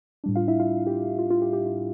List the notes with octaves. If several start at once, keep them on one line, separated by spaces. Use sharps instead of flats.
A2 G3 D4
F4 F5
E4 E5
F4 F5
G4
F4
F4
G4
G4
F4